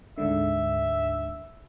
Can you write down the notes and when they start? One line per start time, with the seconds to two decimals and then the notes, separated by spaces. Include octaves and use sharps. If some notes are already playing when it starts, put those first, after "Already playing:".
0.18 D2 G#2 D3 E5